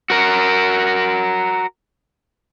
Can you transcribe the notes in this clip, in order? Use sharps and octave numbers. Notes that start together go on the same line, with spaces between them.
F#4 A#4